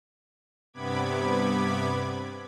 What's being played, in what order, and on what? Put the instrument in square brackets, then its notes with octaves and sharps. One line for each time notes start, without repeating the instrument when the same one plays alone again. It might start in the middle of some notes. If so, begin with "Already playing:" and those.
[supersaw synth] G2 C3 B3 B5 D6 G#6